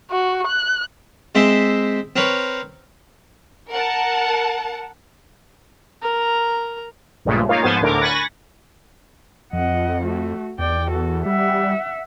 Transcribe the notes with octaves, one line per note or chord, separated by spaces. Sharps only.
F#4
F#6
G#3 C4 C5 E5
C4 A#4 B4 C#5
A#4 F#5 A5
A#4 A#5
A#1 G2 A#2 C#3 G#3 A3
A#3 D#4 F4 C#5 F5
G#2 F3 B3 C5 G#5 A6
D2 A2 D3 A#4 D6
G#5 B5 C#6 F#6 A6 A#6
F2 D#5 F#5
A3 F#4
E2 D5 G5
F#4 A4
G3 E5 F#5